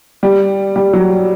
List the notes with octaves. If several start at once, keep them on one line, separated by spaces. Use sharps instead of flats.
G3
G3
F#3